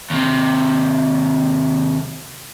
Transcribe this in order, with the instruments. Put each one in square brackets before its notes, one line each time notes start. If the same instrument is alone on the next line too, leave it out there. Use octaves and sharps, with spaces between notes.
[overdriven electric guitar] D#2 C3